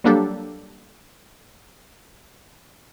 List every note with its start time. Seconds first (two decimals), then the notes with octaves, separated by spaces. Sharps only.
0.04 F#3 G3 A#3 D4 G4 A4